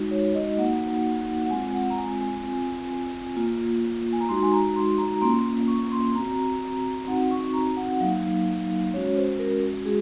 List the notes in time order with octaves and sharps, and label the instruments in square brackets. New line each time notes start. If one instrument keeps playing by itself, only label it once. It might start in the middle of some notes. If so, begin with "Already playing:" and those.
Already playing: [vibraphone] G#3 D#4 F#4
C#5
D#5
A#3 D#4 F#4 F#5
F#5
G#3 C4 F4 G#5
F#5
A#5
G#5
G#5
C4 F4
A#3 F4
G#5
A#5
G#3 D#4 F#4 C6
G#5
A#5
C6
A#5
A#5
A#3 C#4 F4 C6
C#6
C6
C4 F#4 A#5
C4 D#4 F#4 F#5
C#6
A#5
F#5
F#5
F#3 A#3 D#4 F5
G#3 C#4 F#4 C#5
C5
A#4
G#3 F#4 G#4